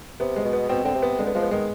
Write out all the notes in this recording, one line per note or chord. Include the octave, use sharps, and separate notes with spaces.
C3 B3
G#3
B2
B3
B2 C4
D3 C4
C3
B3
D3 G#3
B3
F3 G#3
B3
D#3 G#3